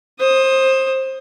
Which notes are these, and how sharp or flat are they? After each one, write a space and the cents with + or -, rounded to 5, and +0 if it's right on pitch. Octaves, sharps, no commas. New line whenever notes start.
C5 +20 D#6 +0